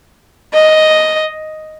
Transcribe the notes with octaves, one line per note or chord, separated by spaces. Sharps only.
D#5